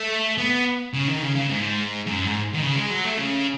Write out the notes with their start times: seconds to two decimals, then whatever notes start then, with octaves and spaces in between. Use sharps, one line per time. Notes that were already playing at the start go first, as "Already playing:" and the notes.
Already playing: A3
0.38 B3
0.94 C#3
1.08 D#3
1.22 C#3
1.36 C#3
1.50 G#2
2.07 F#2
2.25 G#2
2.54 D#3
2.62 C#3
2.76 G#3
2.90 F#3
3.05 A3
3.18 C#3